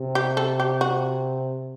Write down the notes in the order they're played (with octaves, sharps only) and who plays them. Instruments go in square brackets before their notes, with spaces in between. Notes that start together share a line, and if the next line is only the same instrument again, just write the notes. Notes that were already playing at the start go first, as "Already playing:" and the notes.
Already playing: [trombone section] C3
[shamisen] G4
A4
G4
F#4